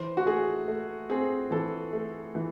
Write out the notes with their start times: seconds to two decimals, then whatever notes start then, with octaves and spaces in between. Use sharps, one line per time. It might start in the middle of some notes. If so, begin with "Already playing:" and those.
Already playing: E3 C5
0.17 F#4
0.26 A3 G#4
0.68 A3
1.10 C4 G#4
1.51 E3 A4
1.93 A3
2.35 E3